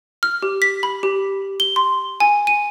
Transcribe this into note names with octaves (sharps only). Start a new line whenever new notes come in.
F6
G4
B6
B5
G4
G7
C6
G#5
D#7